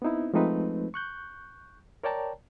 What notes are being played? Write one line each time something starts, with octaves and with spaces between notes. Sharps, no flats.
B3 C4 D#4 E4
F3 G#3 A3 C4 D#4 B4
C#6 F#6 G6
A#4 C#5 D5 G5 A5 A#5